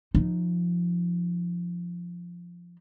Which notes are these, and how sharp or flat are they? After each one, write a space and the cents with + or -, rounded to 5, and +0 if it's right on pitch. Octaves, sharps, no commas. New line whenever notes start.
F3 +0 D#4 -5